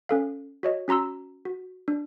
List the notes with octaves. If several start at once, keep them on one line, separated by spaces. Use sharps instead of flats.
C#4 A4 F5
F#4 C#5 D#5
C#4 F#4 A#5 C6 E6
F#4
D4